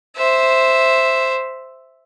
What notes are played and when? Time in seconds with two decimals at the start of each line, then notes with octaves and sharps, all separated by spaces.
0.17 C5 E5